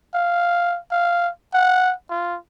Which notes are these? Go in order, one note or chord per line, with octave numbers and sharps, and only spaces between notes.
F5
F5
F#5
F4